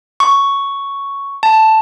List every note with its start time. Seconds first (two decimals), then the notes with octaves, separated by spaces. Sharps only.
0.20 C#6
1.43 A5